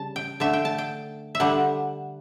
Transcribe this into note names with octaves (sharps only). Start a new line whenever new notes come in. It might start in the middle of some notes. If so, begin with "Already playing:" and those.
Already playing: C#3 G3 A5
G5
D3 A3 E5
G5
A5
G5
E5
D3 G3 F#5